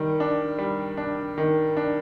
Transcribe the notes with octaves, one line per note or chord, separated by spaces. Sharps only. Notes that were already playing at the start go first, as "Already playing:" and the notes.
Already playing: D#3 G3
D4
G3
D4
D#3
D4